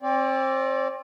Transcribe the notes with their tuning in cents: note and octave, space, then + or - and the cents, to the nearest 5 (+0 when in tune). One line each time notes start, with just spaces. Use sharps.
C4 +30 D5 -20